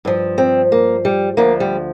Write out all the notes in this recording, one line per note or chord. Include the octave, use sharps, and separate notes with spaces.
G2 F3
C4
A#3
G3
D2 D3 F3 A#3
G3